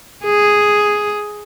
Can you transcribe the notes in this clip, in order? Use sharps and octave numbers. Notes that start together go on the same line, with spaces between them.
G#4